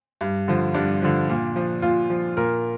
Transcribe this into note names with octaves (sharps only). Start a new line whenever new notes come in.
G2
D3 F3
G2 D4
D3 F3
A#2
F3
A#2 F4
F3
A#2 A#4